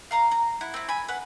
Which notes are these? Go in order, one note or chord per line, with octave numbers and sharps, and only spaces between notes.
F5 A#5 C6
A#5
E4 F#5
C4 E4
G#5 B5
B4 F#5